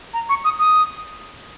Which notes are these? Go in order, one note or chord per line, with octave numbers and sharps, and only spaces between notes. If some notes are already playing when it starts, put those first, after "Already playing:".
A#5
C#6
D#6
D#6